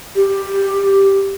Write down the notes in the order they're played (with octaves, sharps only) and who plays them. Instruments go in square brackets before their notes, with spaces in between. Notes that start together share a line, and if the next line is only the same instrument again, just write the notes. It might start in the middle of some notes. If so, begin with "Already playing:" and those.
[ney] G4